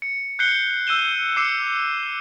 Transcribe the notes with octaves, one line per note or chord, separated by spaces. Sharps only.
C#7
F#6 G6 C7 C#7 G7
E6 G6 D#7 E7 G7
D6 E6 C7 C#7 E7